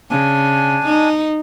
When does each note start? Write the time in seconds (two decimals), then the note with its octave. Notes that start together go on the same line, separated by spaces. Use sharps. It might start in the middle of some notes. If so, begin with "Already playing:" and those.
0.10 C#3 D4 G#5
0.86 D#4